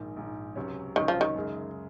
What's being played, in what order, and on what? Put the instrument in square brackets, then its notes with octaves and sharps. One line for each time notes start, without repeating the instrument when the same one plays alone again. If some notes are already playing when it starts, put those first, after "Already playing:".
Already playing: [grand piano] A#1 G#2 D#3
A#1 G#2 D#3
C#2 C3 F#3 C#4
[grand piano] C#2 C3 F#3 C#4 [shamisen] D#3
[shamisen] F3
D#3
[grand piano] F#2 C#3 G#3